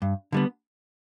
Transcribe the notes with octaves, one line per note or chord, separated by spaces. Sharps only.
G2
D3 G3 B3